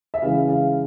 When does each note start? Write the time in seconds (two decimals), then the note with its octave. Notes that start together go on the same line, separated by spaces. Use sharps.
0.14 E5
0.22 C#3 E3 G#3 F5
0.49 F5